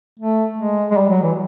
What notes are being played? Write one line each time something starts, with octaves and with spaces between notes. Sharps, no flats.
A3
G#3
G#3
G3
F#3
E3